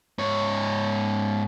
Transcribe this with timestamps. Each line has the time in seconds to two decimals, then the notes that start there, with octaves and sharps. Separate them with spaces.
0.19 G#2 C#5